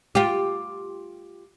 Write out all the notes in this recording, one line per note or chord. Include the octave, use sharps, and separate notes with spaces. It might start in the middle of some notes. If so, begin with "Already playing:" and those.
F4 G4